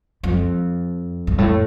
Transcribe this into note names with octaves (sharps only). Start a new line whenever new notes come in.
F2
G2
A2